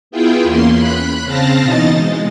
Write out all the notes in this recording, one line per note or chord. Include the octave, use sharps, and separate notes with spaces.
B3 E4 F4 G#4 G5
E2 A#3 C#4 C6
B5 F#6
C#3 C4 F5 A5 A#6
B2 E3 D#4 D#5 A6
G#3